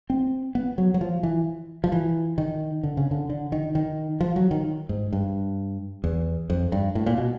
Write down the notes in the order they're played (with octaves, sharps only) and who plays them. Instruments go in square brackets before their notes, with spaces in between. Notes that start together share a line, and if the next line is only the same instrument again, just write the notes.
[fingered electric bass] C4
B3
F#3
F#3
F3
E3
F3
E3
D#3
D3
C#3
D3
D3
D#3
D#3
F3
F#3
D#3
G#2
G2
E2
F2
G2
A2
A#2
B2